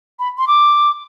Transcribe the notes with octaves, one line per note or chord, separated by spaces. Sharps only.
B5
C6
D6